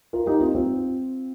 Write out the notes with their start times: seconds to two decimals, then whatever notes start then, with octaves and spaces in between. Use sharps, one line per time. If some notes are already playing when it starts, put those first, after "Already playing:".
0.13 F4 A#4
0.26 D#4 G4
0.40 C4 F4
0.55 C4 F4